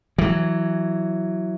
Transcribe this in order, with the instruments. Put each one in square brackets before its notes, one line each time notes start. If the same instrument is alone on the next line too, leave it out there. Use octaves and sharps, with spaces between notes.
[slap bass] E3 F#3